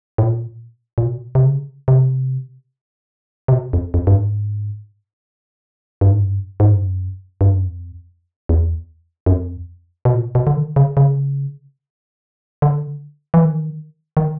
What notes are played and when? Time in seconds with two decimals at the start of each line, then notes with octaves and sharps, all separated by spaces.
0.18 A2
0.22 A#2
0.98 A#2
1.05 B2
1.35 C3
1.46 C#3
1.88 C3
3.48 C3
3.52 B2
3.73 F2
3.94 F2
4.07 G2
4.15 G#2
6.01 G2
6.11 G#2
6.20 G2
6.60 G#2
6.72 G2
6.84 F#2
7.41 G2
7.54 F#2
7.67 F2
8.49 E2
9.26 F#2
9.32 F2
10.05 B2
10.14 A#2
10.35 B2
10.47 D3
10.56 D#3
10.76 C#3
10.97 C#3
12.62 D3
13.34 E3
13.45 D#3
14.17 D#3